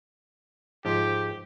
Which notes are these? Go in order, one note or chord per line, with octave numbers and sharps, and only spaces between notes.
G#2 F3 G4